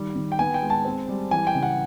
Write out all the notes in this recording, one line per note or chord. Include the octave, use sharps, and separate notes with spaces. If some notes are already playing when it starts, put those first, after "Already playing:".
Already playing: D#3 G3
D#3
G5
B3 G#5
G5
G#3
A5
C4
G3
E3 G#5
G5
C#3
F#5